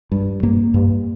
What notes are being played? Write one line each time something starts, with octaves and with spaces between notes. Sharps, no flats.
G2
G2 A#3
G2